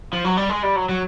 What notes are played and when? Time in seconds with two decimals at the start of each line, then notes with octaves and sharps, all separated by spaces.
0.13 F3
0.24 F#3
0.37 G3
0.49 G#3
0.63 G3
0.76 F#3
0.89 F#3